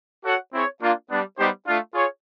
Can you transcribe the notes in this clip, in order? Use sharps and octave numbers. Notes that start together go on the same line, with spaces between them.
F#4 A4 C#5 F#5
C4 E4 G#4 C#5
A#3 D4 F4
G3 B3 D4
G3 B3 D#4 G4 C5
A3 D4 F4
F4 G#4 C#5